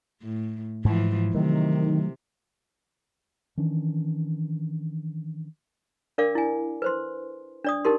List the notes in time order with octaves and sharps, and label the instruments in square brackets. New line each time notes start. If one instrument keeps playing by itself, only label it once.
[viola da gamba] A2
[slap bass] G#2 [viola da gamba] E3 F3
[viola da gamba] C3 [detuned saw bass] D#3 [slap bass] F#3 A3
[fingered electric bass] D#3 E3 C#4 D4
[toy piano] D4 A#4 D5 F5 D6
E4 G#5
B4 C5 C6
D4 D5 D#6
D#4 G4 A#4 C6